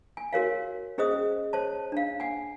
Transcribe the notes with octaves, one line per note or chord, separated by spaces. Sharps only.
G#5
F#4 A#4 C#5 F5
C#4 G#4 C5 D#5 D#6
C5 C#5 A5
D4 F5
F#5 G#5